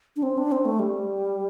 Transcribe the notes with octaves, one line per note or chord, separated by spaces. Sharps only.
D4
C4
D4
C4
A3
G3